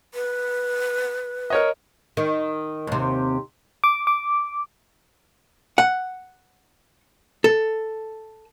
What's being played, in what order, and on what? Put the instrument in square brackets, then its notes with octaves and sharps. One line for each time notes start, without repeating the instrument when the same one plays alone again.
[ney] B4
[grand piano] A#4 C#5 D#5
[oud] D#3
D#2 C3
[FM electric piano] D6
D6
[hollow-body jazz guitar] F#5
A4